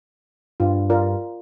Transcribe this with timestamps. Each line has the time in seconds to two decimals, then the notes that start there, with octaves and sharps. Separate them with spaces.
0.60 G2 F4
0.90 F4 A#4 D5